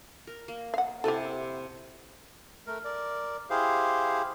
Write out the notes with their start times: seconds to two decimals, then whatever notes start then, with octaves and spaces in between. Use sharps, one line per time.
0.27 A#4
0.48 A#3
0.74 F5 F#5
1.04 C3 E4 G4 A4
2.67 A3 A#4
2.85 A#4 D5
3.50 E4 G4 G#4 C5 F5